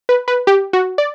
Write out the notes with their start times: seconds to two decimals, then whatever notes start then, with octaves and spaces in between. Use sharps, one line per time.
0.09 B4
0.28 B4
0.47 G4
0.73 F#4
0.98 D5